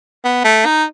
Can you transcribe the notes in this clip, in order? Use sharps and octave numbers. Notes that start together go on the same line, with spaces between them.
B3
A3
D#4